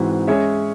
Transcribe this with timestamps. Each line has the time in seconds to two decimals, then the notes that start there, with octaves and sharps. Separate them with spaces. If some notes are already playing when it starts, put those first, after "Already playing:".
Already playing: G#2 E3 C4 F#4
0.27 G#3 C#4 G#4 C#5 E5